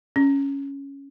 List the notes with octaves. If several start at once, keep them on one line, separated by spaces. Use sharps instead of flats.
C#4